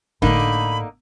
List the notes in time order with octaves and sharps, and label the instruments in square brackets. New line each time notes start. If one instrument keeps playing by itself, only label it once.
[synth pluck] G1 [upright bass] A2 B3 [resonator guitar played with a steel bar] D3 A#3 D#4 [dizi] B5